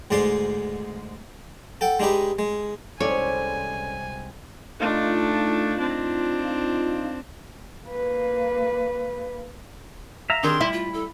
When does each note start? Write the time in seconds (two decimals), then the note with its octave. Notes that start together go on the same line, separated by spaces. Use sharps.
0.11 D2 G#2 G#3 D5 C6
1.81 A4 F#5 G5
1.99 G#3 D4 D#4 G4 B4
2.39 G#3
3.00 C2 G#3 C#4 A4 C#5 D5 G#5
4.80 A3 D4 D#4 F4
5.79 C4 D4
7.86 A#3 B4
10.30 E5 F5 A#5
10.43 D#3 C4 D4 G4 G#4 A#4 C6
10.61 G3 E4 B5
10.73 F4
10.93 A4